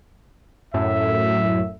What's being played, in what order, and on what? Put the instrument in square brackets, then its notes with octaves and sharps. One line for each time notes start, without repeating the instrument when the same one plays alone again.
[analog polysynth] F#2 A2 [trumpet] E5